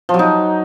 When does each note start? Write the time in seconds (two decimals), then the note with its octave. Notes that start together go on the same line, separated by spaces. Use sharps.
0.09 F3
0.14 F#3
0.19 D#4